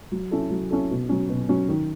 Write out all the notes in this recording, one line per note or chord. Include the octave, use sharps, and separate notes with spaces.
F#3
C#4 E4 A4
F#3
C#4 E4 A4
B2
F#3 C#4
B2
F#3 C#4
D#3